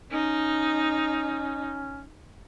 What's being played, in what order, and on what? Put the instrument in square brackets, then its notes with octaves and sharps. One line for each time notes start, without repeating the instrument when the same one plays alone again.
[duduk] C#4 [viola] D#4